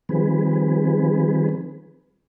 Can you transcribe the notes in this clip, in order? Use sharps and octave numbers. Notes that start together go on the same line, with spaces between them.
D#3 F3 G3 C4 G#4 B4